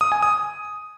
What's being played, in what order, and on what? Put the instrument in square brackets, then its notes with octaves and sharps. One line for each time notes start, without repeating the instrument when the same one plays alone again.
[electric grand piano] D#6
G#5
D#6